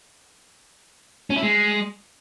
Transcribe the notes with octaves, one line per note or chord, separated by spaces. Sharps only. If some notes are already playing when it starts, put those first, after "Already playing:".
C#4
E4
G#3